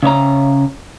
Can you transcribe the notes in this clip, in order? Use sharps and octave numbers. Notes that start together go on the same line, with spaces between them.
C#3 C#4 C#5 A#5